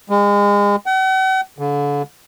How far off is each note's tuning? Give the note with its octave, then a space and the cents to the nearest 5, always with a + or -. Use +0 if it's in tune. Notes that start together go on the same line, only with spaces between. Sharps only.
G#3 -35
F#5 +45
D3 -35